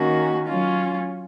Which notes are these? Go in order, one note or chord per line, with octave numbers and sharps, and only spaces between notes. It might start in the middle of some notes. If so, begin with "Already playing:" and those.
Already playing: D#3 A#3 C#4 F#4
F#3 C#4 F4